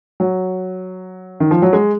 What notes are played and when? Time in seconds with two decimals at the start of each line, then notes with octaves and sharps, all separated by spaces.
0.20 F#3
1.40 D#3
1.51 F3
1.62 F#3
1.73 G#3